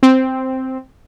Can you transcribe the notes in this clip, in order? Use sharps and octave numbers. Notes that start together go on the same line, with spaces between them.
C4